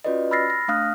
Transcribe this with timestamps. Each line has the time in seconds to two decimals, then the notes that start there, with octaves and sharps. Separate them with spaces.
0.04 C#4 F4 F#4 B4 D5 D#5
0.31 B5 E6 F6 A6 A#6 C7
0.50 A#6
0.68 A3 D4 F5 D#6 F6 F#6